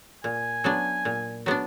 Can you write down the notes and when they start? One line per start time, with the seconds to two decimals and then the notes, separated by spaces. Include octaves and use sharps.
0.24 A#2 G#5
0.64 F#3 B3 D4
1.05 A#2
1.46 F#3 B3 D4